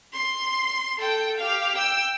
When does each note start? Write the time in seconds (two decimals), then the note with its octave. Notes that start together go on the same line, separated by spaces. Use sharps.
0.14 C6
0.98 A4 G5
1.37 G4 F5
1.76 G5 E6